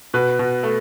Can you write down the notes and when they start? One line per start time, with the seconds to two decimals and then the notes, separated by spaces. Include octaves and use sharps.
0.14 B2 B4
0.39 B2
0.63 A3